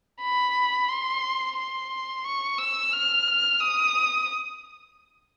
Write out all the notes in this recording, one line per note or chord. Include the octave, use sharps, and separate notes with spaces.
B5
C6
C6
C#6
E6
F6
D#6